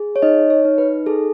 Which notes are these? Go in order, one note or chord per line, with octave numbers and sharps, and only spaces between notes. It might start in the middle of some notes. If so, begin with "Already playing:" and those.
Already playing: G#4
C#5
D#4 D#5
C#5
D#4
B4
G#4 A4